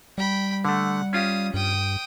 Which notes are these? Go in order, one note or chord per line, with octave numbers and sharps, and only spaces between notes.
G3 G5 B5
D3 A3 F#5
C#4 F4 G4 F5 D#6
G2 G5 D#6